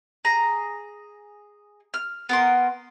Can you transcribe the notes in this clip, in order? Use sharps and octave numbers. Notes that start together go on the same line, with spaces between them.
G#4 A#5
F6
B3 A#4 C6